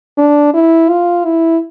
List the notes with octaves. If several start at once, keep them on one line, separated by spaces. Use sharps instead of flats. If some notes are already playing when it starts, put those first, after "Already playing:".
D4
E4
F4
E4